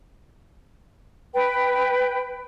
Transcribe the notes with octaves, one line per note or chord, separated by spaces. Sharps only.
B4 G5